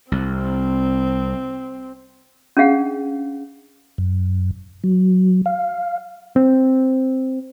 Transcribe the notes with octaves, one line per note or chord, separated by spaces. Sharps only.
C2 C4
C#4 D4 G#4 F5 F#5
F#2
F#3
F5
C4